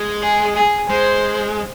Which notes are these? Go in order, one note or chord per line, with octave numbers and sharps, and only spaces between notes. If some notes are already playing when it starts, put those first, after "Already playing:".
Already playing: G#3
G#4
G#4
G#3 C5